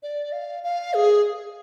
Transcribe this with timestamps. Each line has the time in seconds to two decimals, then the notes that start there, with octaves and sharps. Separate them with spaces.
0.03 D5
0.32 F5
0.64 F5
0.94 G#4